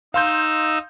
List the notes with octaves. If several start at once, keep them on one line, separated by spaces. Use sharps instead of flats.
D#4 F5 C6 E6 G6